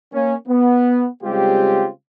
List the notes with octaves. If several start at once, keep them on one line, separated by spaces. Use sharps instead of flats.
A#3 C#4
B3
C#3 G3 G#3 C4 F4 G4